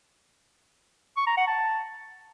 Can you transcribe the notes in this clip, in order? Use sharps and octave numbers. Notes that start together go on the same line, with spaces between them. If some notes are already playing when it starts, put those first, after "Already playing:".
C#6
A#5
F#5
A5